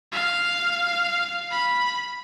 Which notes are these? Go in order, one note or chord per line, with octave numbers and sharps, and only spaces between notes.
F5
B5